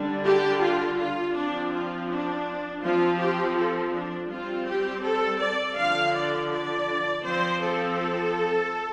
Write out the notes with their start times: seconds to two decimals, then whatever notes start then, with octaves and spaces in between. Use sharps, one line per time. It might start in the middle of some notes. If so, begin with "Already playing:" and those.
Already playing: D3 G3 D4
0.25 G4
0.62 F4
0.98 F4
1.35 F3 C4 D4
1.72 F4
2.10 D4
2.83 F3 C4 F4
3.20 G4
3.57 A4
3.93 D4
4.30 G3 C4 F4
4.67 G4
5.04 A4
5.41 D5
5.78 D3 F3 D4 F5
6.15 D5
6.51 D5
7.25 F3 C4 C5
7.62 A4